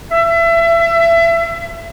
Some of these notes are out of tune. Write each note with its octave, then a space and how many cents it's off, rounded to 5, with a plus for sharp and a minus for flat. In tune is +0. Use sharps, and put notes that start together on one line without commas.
E5 +30